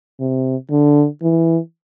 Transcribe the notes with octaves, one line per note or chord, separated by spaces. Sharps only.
C3
D3
E3